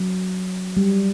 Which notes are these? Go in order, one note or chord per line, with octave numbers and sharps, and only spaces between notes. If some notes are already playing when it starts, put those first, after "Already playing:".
Already playing: F#3
G3